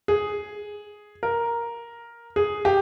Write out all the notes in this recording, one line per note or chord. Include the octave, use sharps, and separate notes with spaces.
G#4
A#4
G#4
G4